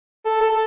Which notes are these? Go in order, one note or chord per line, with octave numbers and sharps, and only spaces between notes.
A4
A4